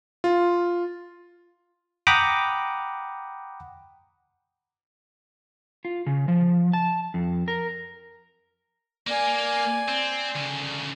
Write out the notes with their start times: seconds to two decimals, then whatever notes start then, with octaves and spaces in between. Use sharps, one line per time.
0.24 F4
2.07 F#5 G5 A#5 B5 D6 D#6
5.85 F4
6.06 C#3
6.28 F3
6.73 A5
7.14 F2
7.48 A#4
9.07 A#3 D5 G#5
9.88 C4
10.35 D2 C#3